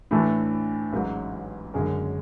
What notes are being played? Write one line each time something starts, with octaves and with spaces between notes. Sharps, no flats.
A2 E3 A3 D4 A4
A1 G#2 F#3
F#1 F#2 D3 G#3 C#4